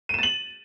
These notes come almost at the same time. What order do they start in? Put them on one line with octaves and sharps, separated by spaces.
D#7 E7 A6 F#7